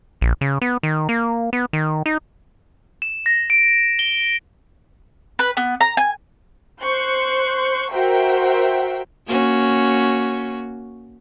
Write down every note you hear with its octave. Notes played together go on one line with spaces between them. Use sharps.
A#1
C#3
B3
D#3
A#3
B3
D#3
D#4
E7
A#6
D7
G7
B4
B3
A#5
G#5
C5 C6 C#6 F#6 G6
F#4 A#4 C5 E5 F#5 G5
A#3 C#4 F#4